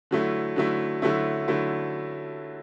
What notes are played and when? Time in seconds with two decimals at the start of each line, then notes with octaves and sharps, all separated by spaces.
0.11 D3 F#3 A3 E4
0.56 D3 F#3 A3 E4
1.02 D3 F#3 A3 E4
1.48 D3 F#3 A3 E4